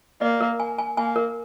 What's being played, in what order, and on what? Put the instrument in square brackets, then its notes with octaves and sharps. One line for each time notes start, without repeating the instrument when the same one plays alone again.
[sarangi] A#3 [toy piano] D5
[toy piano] A#4
G#5
G#5
[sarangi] A#3 [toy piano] G#5
[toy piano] A#4